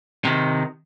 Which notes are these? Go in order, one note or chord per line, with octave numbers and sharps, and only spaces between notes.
C3 D#3